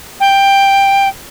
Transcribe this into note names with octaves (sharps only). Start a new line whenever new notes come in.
G5